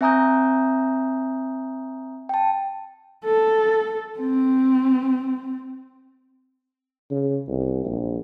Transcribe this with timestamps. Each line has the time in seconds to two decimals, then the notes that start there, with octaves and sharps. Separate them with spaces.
0.01 C4 E5 G#5 A#5 D#6 G6
2.29 G5 A5
3.25 A4
4.20 C4
7.11 C#3
7.48 C2
7.85 A#1